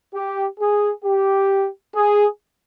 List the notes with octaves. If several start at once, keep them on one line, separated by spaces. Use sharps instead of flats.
G4
G#4
G4
G#4